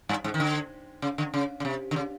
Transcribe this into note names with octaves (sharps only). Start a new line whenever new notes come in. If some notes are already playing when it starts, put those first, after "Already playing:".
G2
G#2
D#3
D3
C#3
D3
C#3
C#3
C3
D3
C#3